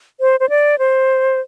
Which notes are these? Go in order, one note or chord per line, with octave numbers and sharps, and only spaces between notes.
C5
C5
D5
C5